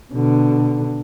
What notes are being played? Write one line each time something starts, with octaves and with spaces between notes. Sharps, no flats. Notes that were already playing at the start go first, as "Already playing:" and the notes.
B2 D3